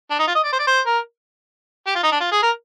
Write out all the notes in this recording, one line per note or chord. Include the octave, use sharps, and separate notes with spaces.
D4
D#4
F4
D#5
D5
C5
D5
C5
A#4
G4
F4
D#4
D4
F4
G#4
A#4